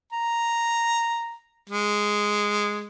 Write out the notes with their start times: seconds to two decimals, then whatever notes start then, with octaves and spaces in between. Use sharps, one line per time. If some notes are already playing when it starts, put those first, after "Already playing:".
0.13 A#5
1.70 G#3